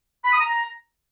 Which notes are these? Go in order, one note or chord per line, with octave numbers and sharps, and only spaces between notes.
B5
D#6
A#5